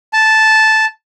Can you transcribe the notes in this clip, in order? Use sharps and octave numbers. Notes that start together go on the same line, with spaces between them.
A5